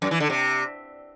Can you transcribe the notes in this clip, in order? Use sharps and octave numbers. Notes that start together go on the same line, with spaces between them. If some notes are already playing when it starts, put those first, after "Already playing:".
F#2
E3
D3
C3